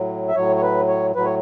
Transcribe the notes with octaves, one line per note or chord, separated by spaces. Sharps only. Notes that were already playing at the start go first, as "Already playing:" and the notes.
Already playing: A2 F#3
E5
A2 F#3 C#5
C#5
B4
C#5
A2 F#3 B4
C#5